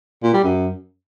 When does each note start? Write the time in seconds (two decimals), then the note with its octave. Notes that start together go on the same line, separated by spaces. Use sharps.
0.23 A#2
0.34 G3
0.44 F#2